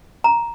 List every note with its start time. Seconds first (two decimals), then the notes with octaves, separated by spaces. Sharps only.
0.24 A#5